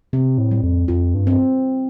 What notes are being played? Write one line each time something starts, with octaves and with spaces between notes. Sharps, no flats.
C3 C4
A2
G3
F2
F2 F4
G2
C4